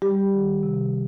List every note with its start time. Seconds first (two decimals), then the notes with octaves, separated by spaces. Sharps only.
0.02 G3 G4
0.33 D#3
0.63 C3